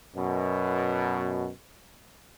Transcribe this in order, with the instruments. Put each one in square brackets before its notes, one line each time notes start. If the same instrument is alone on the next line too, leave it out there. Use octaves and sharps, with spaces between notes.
[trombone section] F#2 B2